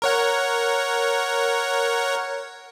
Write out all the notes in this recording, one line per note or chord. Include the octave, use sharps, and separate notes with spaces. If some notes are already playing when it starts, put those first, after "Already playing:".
A#4 C#5 F#5